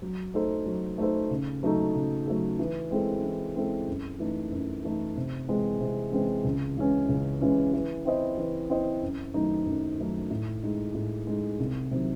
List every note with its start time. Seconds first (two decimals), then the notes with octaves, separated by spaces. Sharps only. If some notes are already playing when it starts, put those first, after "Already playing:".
0.02 F#3
0.34 A3 D#4 A4 C5
0.66 F#3
0.98 A3 D#4 A4 C5
1.31 C#3
1.63 F#3 A3 D#4 A4
1.95 C#3
2.27 F#3 A3 D#4 A4
2.59 E3
2.91 G#3 C4 E4 A4
3.23 E3
3.56 G#3 C4 E4 A4
3.88 F#2
4.20 E3 A3 D#4
4.52 F#2
4.84 E3 A3 D#4
5.17 C3
5.48 E3 G#3 C4
5.80 C3
6.12 E3 G#3 C4
6.44 C#2
6.77 C#3 E3 G#3 C#4
7.09 C#2
7.41 C#3 E3 G#3 C#4
7.73 E3
8.05 C4 E4 C5 D#5
8.38 E3
8.70 C4 E4 C5 D#5
9.02 F#2
9.34 D#3 F#3 A3 D#4
9.66 F#2
9.98 D#3 F#3 A3 D#4
10.30 A2
10.63 G#3 D#4
10.95 A2
11.27 G#3 D#4
11.59 C2
11.91 C3 D#3 F#3